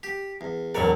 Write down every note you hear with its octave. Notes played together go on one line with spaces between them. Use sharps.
G4
E2
E1 F#3 A#4 C#5 D5